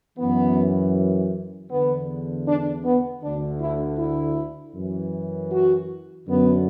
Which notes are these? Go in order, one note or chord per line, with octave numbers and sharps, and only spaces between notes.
F#2 E3 B3
E2 D3 B3
D4
B3
D2 D3 D4
E4
E4
F#2 E3
F#4
F#2 D3 B3